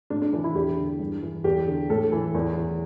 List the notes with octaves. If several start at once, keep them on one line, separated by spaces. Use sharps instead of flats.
A2 D4
D4
E3 D4
E4
E2 G4
D3
G2
E3
E2 G4
D3
A2 A4
E3
E2
E3